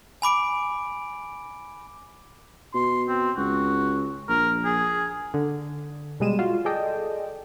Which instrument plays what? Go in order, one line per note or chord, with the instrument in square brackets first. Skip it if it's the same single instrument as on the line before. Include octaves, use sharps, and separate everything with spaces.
[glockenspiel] G#5 B5 D6 D7
[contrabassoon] B2 [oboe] C6
[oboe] C4
[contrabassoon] C#2 [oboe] F#4
[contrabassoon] A#1 [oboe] A#4
[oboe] G#4
[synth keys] D3
B2 G3 G#3 D#7 E7
F4 F#4
G#4 A4 D5 D#5 G5 A5